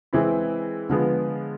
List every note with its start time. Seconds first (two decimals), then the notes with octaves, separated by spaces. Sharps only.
0.13 E3 G#3 C4 E4
0.89 D3 F3 G#3 B3